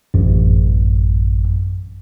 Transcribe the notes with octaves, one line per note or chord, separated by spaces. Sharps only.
A1 F#2